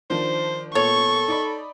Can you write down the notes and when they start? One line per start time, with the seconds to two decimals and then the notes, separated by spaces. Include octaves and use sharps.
0.10 D#3 F3 D4 C5
0.75 A#2 B3 A4 C#5 C#6
1.28 D#4 D5 B5